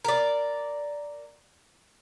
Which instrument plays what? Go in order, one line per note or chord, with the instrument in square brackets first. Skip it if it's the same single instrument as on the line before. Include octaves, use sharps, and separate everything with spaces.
[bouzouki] A#4 D5